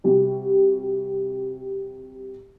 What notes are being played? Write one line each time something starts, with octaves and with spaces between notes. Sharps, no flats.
C3 G3 F#4